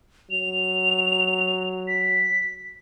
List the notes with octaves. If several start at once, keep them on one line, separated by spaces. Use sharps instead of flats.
F#3 F7
B6